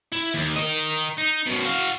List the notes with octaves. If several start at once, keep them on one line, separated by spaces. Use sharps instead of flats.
E4
D#2
A#4 D#5
D#4
F#2 B2
F#4 F5